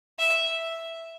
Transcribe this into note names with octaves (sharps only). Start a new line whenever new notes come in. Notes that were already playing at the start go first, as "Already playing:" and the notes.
E5